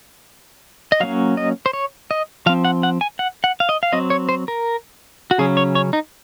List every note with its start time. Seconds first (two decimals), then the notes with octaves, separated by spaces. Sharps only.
0.92 D#5
1.00 F#3 A#3 C#4 F5
1.37 D#5
1.66 C5
1.73 C#5
2.11 D#5
2.46 F3 F5
2.49 C4
2.65 F#5
2.83 F#5
3.01 G#5
3.19 F#5
3.44 F#5
3.60 F5
3.69 D#5
3.83 F5
3.92 F#3 C4 D#5
4.10 C#5
4.29 C5
4.48 A#4
5.31 F#4
5.38 C#3 F#3 C#4 G#4
5.57 C#5
5.75 C#5
5.93 D#4